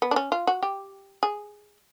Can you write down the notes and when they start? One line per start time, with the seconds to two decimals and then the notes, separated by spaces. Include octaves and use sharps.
0.02 B3
0.11 D4
0.16 C#4
0.32 F4
0.47 F#4
0.63 G4
1.23 G#4